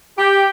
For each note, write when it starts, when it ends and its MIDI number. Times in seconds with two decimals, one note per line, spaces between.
0.18 0.47 67